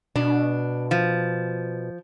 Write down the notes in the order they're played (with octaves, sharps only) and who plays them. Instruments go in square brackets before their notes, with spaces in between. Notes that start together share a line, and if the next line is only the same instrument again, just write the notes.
[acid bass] B2 [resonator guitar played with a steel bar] D4
[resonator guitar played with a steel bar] F3